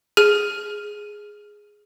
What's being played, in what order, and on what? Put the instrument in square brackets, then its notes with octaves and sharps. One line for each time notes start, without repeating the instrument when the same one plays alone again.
[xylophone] G#4 F6 D#7